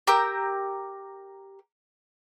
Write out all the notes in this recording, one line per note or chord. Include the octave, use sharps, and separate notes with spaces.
G4 A#4 E6 G6